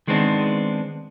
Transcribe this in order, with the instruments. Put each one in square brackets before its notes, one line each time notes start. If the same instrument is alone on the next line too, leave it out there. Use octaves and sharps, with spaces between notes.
[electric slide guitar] D#3 G#3 B3 C4 D4 D#4